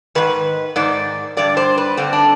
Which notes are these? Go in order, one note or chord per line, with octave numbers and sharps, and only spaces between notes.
G#2 D#3 B4
G#2 D#3 D5
G2 D3 D5
C5
B4
G2 D3 C4
D4